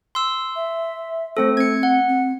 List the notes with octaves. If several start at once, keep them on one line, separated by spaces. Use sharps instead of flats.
C6 E6
E5
A3 C4 A4 C5
C4 G#6 C#7
F#5
C4